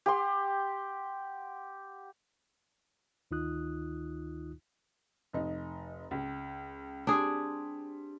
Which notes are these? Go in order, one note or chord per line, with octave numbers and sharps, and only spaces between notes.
G4 F#5 C6
D2 D#3 D#4 F4 D#6 F#6
F1 D#4
C#2
G3 C4 D4 G#4